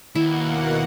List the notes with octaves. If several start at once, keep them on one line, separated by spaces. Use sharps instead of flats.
D#2 B2 A#3 E4 F#5